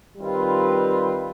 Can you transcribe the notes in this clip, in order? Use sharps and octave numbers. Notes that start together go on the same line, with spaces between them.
D#3 G3 C4 F4 B4